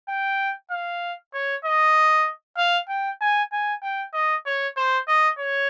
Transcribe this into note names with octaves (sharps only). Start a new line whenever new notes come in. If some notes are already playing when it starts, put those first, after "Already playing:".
G5
F5
C#5
D#5
F5
G5
G#5
G#5
G5
D#5
C#5
C5
D#5
C#5